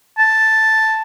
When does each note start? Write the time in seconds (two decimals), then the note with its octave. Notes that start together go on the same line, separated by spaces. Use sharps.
0.18 A5